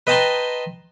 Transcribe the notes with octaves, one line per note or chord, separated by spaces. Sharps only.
B4 D#5 G5 A5 A#5 C6